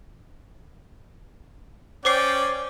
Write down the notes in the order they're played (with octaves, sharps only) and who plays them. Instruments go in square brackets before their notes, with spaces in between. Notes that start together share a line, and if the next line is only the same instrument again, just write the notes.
[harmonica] C#4 D5 G5 [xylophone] C5 D6 C7